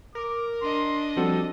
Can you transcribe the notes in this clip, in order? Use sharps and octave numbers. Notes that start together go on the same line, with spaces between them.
A#4 D6
D4 D#5 C6
F3 G3 C4 F#4 A4